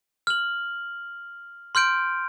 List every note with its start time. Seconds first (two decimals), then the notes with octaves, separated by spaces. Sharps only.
0.27 F6 F#7
1.75 C6 F6 G6 D7